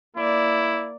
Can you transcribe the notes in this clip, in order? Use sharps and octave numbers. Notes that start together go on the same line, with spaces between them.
A#3 E4 D5